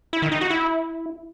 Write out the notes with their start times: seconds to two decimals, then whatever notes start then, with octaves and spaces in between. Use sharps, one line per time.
0.13 E4
0.22 D#3
0.32 D#4
0.41 F#4
0.50 E4